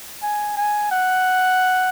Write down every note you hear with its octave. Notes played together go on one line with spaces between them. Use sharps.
G#5
G#5
F#5